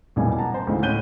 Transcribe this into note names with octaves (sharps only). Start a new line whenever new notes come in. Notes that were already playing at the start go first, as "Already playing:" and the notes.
B1 E2 A#2 C#3 G3 G#5
F#5 A5 A#5
C5
D2 G#2 C#3 E3
A2 C#4 F#6 G6 D#7 G7